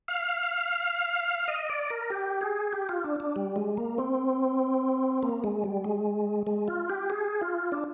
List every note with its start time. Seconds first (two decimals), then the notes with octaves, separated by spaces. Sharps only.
0.08 F5
1.48 D#5
1.69 D5
1.90 A#4
2.10 G4
2.41 G#4
2.73 G4
2.89 F4
3.04 D4
3.20 D4
3.36 G3
3.56 G#3
3.77 A#3
3.98 C4
5.23 A#3
5.44 G#3
5.64 G3
5.84 G#3
6.47 G#3
6.68 F4
6.89 G4
7.10 G#4
7.41 F4
7.72 D4